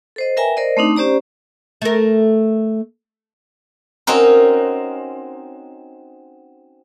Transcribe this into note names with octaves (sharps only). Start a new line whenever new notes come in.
A4 C5 D#5
A#4 B4 E5 G5 G#5 A#5
A#4 C5 D5 D#5
A3 C4 D4 D#4
C#4 G4 C5 D5 A#5
A3 A#4
C4 C#4 D#4 F#4 A#4